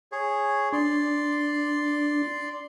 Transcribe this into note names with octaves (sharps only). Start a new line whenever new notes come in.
G#4 C#5
D4 D5 C6